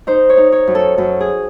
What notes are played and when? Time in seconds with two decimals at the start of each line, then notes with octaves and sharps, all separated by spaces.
0.07 D#4 C5
0.30 C#5
0.37 D#4
0.52 C#5
0.67 F#2
0.75 A4
0.98 F#2 A4
1.21 G#4